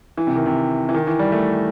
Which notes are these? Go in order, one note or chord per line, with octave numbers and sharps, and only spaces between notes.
E3
C3
D#3
C3
E3
D#3
E3
G3
A3